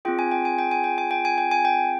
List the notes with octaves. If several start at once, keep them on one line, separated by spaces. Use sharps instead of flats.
C4 F4 G#4 G5
G#5
G5
G#5
G5
G#5
G5
G#5
G5
G#5
G5
G#5
G5